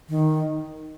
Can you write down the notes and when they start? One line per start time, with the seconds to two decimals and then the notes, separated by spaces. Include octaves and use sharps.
0.09 D#3